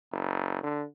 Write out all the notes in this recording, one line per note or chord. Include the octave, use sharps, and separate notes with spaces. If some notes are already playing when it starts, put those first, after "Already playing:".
F#1
D3